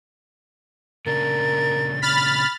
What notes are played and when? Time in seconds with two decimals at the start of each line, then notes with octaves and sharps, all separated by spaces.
1.06 A#2 C#3 D4 A#4 A6
2.02 B5 F6 A6